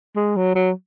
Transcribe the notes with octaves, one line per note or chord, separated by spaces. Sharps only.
G#3
F#3
F#3